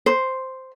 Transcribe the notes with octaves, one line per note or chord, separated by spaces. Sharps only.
C5